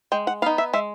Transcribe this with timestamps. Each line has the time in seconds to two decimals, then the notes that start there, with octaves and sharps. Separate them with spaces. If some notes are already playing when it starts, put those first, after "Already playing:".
0.12 G#3 G5
0.27 F#5
0.42 B3 D#4 F5
0.58 E5
0.73 G#3 E5